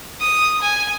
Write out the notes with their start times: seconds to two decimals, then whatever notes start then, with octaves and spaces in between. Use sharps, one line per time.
0.21 D#6
0.62 G#5